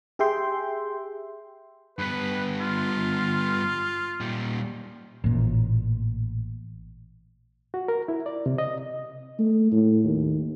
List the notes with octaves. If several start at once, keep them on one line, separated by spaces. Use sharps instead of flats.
G4 G#4 E5 G5 C6
G2 B3 B4
F4
A#2 G3
A1 A#2
F#4
A#4
E4
D5
C3
D#5
A3
A2
D#2